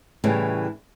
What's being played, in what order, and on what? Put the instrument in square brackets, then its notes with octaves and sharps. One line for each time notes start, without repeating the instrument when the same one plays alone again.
[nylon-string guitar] A2 C#3 E3 G3